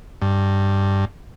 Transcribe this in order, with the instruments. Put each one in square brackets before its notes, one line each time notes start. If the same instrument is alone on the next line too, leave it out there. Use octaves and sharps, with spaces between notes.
[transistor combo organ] G2